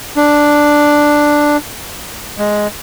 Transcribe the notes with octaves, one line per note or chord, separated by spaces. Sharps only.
D4
G#3